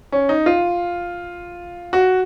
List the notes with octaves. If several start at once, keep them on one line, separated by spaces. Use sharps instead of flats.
C#4
D#4
F4
F#4